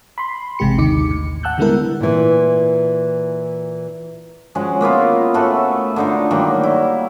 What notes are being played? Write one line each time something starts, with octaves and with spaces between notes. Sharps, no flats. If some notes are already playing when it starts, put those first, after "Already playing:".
B5 C6
A1 C3 G#3 G4 C#7
D#2 D3 D#4 D6 C#7
A2
F#5 A5 E6 F#6 G6
D3 G3 G#3 B3 E4 A#4
A#2 E3
F3 G#3 C#4 F#4
A#3 B3 E4 F4
A2 A3 F#4 A4
D3 D#4 F4
D#3 F#3 G3 A#3
E4